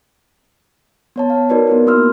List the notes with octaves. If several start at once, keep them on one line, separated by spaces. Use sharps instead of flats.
B3 C#5 A5
C#5 F5
D#4 F#4 A#4 B4 D5
B3 E4 A#4
A#3 F#4 C6 E6 F6